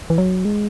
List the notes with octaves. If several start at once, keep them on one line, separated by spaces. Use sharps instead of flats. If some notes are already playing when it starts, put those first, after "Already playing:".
E3
F#3
G#3